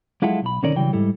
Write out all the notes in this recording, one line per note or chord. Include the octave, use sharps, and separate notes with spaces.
F#3 G#3 E4 F4 A4 F#5
B1 B5
B1 D3 D#3 C#4 A#4 D5
C#3 E3 F#3 G3 G5
G#2 G3 E4 A4